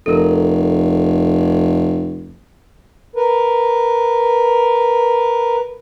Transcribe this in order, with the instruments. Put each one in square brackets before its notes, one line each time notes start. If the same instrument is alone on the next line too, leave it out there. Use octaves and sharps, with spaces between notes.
[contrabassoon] F1 [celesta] A4 A#4
[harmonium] A#4 B4